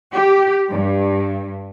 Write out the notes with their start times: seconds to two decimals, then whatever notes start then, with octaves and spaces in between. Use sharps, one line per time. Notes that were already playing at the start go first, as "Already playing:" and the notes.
0.14 G4
0.71 G2